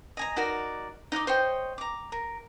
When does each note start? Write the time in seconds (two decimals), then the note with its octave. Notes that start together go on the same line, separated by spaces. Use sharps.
0.17 D#5 G#5 A#5
0.36 D#4 F#4 A#4 D5
1.12 D#4 D#5 F#5 D6
1.27 C5 C#5 D#5 G5
1.78 A#5 D6
2.12 A#4